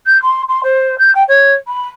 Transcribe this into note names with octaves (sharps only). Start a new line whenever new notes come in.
G6
C6
C6
C5
G6
G5
C#5
B5